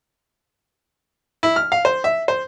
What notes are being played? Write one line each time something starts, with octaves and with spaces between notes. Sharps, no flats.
E4
F6
F5
C5
E5
C5